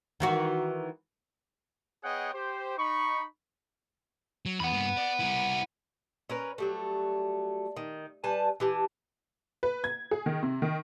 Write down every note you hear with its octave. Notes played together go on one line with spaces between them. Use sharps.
D#3 E3 F#4
B3 G#4 C#5 D#5 F#5 G5
G4 C5
D#4 B5 C#6
F#3
E2 F#5 B5
G2 A#3
D5
G3 E4
C#4 A#4 B4
F#3 G3 A3
D#3
G3 B4 G#5 A5
E3 G4 A5
B4
G#6
G#4
D#3
C3
D#3